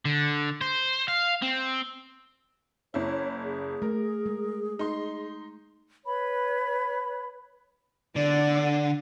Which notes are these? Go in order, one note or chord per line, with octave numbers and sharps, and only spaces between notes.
D3
C5
F5
C4
F#1 E4 C#5
G#4
A3 A#4
G#3
D#4 C6
B4 C#5 B5
D3 D5